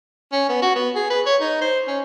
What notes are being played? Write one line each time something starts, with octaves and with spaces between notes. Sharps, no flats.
C#4
B3
F#4
B3
G#4
B4
C#5
D#4
C5
C#4